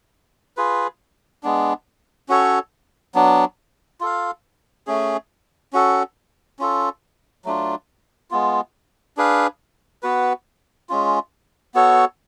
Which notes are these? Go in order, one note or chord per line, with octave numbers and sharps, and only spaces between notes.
F4 G#4 B4
G#3 B3 D4
C#4 F#4 A4 C#5
F#3 B3 D4
F4 A4 F5
A3 C#4 G#4
C#4 F#4 A4
C#4 F4 A4
F#3 A3 D4 F4
G#3 B3 F4
D4 G#4 B4 F5
B3 F#4 B4
G#3 C#4 F4
B3 F#4 A4 C#5